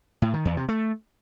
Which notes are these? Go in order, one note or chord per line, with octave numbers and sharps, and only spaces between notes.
A2
D#3
E2
C3
A3